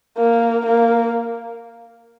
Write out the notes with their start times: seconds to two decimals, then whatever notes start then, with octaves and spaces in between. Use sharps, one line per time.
0.18 A#3
0.66 A#3